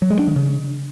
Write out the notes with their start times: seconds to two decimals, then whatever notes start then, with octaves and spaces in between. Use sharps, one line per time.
0.02 F#3
0.10 G#3
0.19 D4
0.27 D#3
0.36 C#3